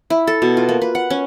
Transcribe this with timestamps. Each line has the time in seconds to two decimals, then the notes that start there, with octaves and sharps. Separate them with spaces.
0.10 E4
0.27 A4
0.42 B2
0.57 F4
0.69 A#3
0.82 B4
0.95 F#5
1.10 C#4